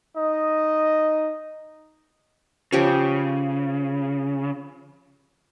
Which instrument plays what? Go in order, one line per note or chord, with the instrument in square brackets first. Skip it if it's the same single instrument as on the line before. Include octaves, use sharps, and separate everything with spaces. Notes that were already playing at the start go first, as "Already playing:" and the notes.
[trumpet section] D#4 D#5
[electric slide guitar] C#3 [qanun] F3 G4 C#5